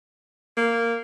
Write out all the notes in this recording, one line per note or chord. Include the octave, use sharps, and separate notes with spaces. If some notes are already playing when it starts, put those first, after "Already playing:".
A#3